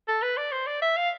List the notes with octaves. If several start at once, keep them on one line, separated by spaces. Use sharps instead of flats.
A4
B4
D5
C5
D5
E5
F5